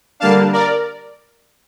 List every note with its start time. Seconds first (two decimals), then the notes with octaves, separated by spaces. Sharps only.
0.20 D3 G3 A#3 D4 F5 A5
0.53 A#4 D5